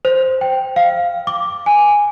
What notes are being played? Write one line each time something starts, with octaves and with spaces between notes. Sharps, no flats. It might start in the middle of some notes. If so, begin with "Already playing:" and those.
C5
G5
F5
D6
G#5